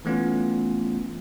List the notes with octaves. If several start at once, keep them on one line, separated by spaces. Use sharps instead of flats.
E3 A3 B3 C#4 F4